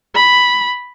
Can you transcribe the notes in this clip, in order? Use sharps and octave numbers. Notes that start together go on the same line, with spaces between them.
B5